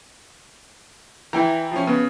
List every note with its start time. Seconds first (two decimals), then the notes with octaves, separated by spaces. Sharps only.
1.33 E3 E4 G5 A#5
1.72 F3 C#4
1.87 C#3 B3